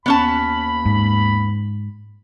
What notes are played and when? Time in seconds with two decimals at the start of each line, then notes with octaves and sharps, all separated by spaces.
0.06 D#2 B3 C#4 A5 B5
0.86 G#2